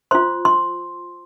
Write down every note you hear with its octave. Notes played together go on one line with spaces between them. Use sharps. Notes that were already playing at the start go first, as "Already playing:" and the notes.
F4 C5 C6
C6